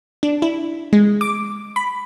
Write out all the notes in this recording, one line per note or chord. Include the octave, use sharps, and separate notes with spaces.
D4
E4
G#3
D6
B5